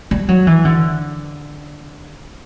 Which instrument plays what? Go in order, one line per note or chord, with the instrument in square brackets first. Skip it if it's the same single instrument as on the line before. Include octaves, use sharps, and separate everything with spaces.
[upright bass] G3
F#3
E3
D3